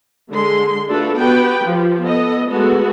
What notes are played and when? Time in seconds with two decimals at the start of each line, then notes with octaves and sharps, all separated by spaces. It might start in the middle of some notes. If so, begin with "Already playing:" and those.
0.30 D3 G#3 C6
0.87 A3 D4 F4 F#4 A4 B4
1.16 B3 F#4 G4 B4 G5
1.64 F3 F4 G4
2.01 B3 A4 D#5
2.49 G#3 A3 B3 F#4 A4